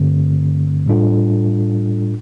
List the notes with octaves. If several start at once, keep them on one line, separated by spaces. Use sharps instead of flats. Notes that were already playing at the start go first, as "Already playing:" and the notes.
Already playing: G2 D3 A3 C4
A2 G3 D4 F4 A4